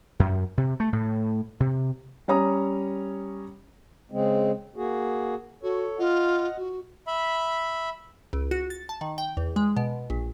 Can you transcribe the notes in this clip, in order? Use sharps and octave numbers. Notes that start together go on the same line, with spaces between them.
F#2
C3
A3
A2
C3
G3 C#4 C#5 A#5 D#6
C#3 G#3 C4
A#3 F#4 G#4
F#4 A4 C#5
F4 D#5 F#5
F#4
E5 B5
C#2
F#4
A6
A5
D#3
G5
E2
G#3
B2
A#1